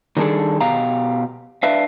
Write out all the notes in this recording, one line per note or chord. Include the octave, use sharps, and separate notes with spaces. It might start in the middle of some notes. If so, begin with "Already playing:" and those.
D#3 G3 C4 D4 G#4 A4
B2 G4 F5 A#5
D4 B4 E5 F5